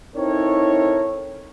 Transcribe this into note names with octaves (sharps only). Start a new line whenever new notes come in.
C4 D#4 E4 A4 A#4 C#5